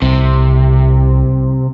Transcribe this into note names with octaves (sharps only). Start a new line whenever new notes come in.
C2 C3